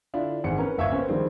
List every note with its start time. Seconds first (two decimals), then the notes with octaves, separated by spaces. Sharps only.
0.14 D3 D4 E4 F4
0.44 G#1 E3 G#4 C#7
0.58 C#4 A#4 B4
0.77 D1 G1 E5 F5 C#6 G#6
0.91 A#3 C4 C#4 A#4 B4
1.09 D3 D#3 F3 G3 G#3 C4